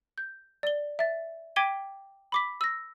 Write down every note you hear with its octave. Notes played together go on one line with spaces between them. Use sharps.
G6
D5 G7
E5 A6
G5 D6 G#6 B6 D#7 G7
B5 D6 B6
E6 A#6